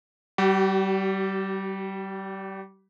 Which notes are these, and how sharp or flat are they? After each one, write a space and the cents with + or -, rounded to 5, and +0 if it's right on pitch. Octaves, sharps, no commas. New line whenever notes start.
G3 -25 F#4 +45